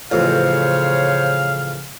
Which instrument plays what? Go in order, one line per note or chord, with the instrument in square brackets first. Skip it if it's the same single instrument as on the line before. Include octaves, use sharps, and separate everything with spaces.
[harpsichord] A1 F2 [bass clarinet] C#3 [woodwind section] C5 C#5 [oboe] F5